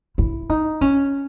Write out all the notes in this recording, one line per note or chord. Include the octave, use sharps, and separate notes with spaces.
E4
D#4
C#4